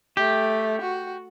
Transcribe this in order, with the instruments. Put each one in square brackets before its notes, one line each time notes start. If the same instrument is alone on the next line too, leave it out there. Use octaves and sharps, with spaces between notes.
[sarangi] A3 [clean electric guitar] G4
[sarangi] F#4